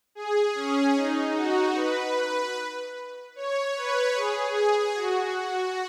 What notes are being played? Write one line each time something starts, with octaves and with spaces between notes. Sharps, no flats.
G#4
C#4
D#4
F#4
B4
C#5
B4
G#4
G#4
F#4